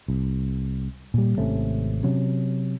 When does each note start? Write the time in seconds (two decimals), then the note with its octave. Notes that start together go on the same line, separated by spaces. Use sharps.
0.08 C2
1.14 A#2 G3
1.37 G#1 C3 A3 C#4
2.03 C3 F#3 C#4